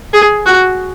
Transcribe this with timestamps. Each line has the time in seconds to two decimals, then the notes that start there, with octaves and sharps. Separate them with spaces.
0.14 G#4
0.46 F#4